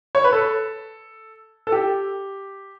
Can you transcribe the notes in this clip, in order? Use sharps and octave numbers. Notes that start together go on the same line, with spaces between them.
C#5
B4
A4
A4
G4